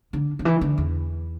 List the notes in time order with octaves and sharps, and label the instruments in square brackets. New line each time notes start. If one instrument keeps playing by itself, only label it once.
[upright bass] D3
D3
E3
D3
E2